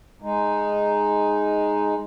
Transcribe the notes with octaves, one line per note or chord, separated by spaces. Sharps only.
G#3 D#4